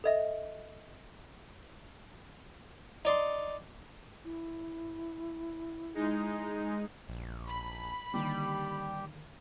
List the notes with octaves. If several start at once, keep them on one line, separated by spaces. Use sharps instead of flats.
A4 D#5 E5
D#4 D5 C6
E4
G#3 D#4
A#1
B5
D3 D#3 G3 A#3 G4